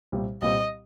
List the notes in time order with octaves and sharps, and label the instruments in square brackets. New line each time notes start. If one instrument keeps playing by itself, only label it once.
[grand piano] C2 A#2 G3 C4
[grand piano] C2 A#2 G3 C4 [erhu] D#5